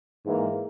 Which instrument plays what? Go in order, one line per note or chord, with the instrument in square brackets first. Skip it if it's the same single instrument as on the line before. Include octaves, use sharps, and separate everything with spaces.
[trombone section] G#2 E3 A#3